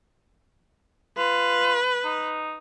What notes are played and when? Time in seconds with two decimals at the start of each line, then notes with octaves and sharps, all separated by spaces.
1.17 F4 B4
2.05 D#4